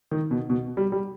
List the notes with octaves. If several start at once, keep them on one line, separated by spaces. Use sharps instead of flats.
D#3
B2
B2
G3
G3